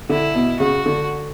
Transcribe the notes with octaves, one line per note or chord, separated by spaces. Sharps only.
D3 E4
B2
C#3 F#4
D3